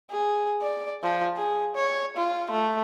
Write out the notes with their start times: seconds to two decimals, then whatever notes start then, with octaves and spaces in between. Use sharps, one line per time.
0.10 G#4
0.62 D5
1.03 F3
1.37 G#4
1.75 C#5
2.17 F4
2.51 A3